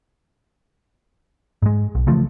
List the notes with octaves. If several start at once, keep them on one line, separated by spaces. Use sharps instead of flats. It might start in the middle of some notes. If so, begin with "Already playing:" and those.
G#2 G#3
B1
C#3 E3 F3 A3